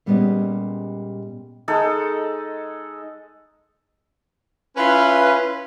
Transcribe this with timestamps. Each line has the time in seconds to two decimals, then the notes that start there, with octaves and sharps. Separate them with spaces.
0.06 A#2 G3 G#3 B3 C#4 D#5
1.68 G#3 D#4 A4
4.77 C#4 E4 F4 B4